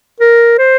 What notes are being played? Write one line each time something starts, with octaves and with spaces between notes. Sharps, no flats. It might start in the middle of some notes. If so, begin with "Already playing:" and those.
A#4
C5